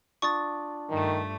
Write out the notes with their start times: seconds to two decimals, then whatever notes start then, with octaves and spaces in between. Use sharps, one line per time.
0.22 D4 F4 C#6 D#6 A6
0.90 G2 D#3 A3